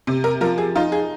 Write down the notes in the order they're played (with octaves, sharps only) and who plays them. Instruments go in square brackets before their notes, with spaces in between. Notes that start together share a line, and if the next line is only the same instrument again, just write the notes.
[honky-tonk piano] C3
A#4
F3 A#4
G#4
D#4 F4
G#4